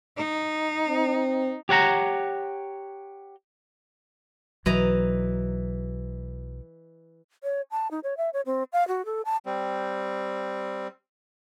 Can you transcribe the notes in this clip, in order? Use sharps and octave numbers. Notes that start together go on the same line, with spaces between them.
D#4
C4
G4 C#5 F#5 A#5
B1 E3 F#3 D#5 A#5
C#5
A5
D#4
C#5
E5
C#5
C4
F5
F#4
A4
A5
G3 C4